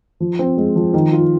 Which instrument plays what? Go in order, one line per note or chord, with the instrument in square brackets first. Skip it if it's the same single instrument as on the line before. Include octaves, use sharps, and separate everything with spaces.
[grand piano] F3
C4
G#3
F3
D#3
F4